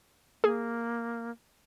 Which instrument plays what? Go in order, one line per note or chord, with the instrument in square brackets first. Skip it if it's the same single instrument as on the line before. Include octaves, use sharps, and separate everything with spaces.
[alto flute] A#3 [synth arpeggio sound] G#4